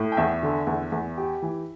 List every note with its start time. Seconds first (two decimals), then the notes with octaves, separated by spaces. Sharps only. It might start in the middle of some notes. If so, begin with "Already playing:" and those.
Already playing: A2
0.12 G5
0.17 E2 E5
0.43 D3
0.67 E2
0.92 E2
1.18 G4
1.42 E3